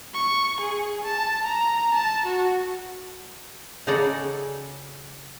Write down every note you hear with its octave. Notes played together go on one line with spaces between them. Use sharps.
C#6
G#4
A5
A#5
A5
F#4
C#3 D#4 F#4 G#4 A4 D5